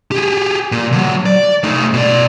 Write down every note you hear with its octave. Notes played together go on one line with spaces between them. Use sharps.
G4 G#4
A#2
D3 F#3
D5
A3 D#4
B2 D5